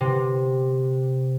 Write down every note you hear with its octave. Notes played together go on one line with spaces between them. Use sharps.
C3